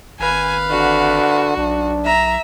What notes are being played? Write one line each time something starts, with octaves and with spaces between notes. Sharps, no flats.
G#1 B4 F5 G#5
D3 F#4
B1 D4
E5 A#5